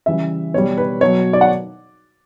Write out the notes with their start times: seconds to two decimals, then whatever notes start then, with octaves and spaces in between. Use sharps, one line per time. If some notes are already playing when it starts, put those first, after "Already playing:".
0.06 C#3 E3 G3 E5
0.54 B2 G3 C#5
0.78 B4
1.01 B2 F#3 C#5
1.33 D5
1.41 F#5